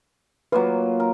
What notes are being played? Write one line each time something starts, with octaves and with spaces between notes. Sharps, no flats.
F#3 A#3 F4 B4
A#4